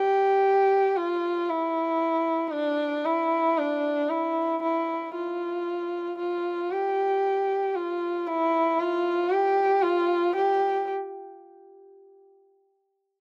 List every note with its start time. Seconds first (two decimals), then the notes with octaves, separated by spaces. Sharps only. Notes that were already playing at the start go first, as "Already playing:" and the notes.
Already playing: G4
0.96 F4
1.50 E4
2.53 D4
3.05 E4
3.58 D4
4.10 E4
4.63 E4
5.15 F4
6.19 F4
6.71 G4
7.75 F4
8.27 E4
8.80 F4
9.31 G4
9.83 F4
10.36 G4